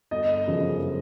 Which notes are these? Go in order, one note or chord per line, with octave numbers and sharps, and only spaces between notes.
G1 D#5
F#2 C#3 F3